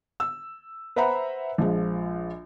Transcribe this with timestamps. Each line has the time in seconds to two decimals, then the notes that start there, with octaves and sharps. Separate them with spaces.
0.20 E6
0.96 B4 C5 E5 F#5 A#5 B5
1.58 A#1 F3 G#3